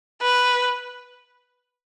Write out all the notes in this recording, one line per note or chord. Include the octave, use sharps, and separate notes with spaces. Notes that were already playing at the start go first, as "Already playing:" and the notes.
B4